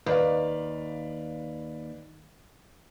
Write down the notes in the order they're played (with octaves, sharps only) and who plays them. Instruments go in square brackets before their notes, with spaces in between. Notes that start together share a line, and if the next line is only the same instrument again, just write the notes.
[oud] D#2 [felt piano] B4 D5 F5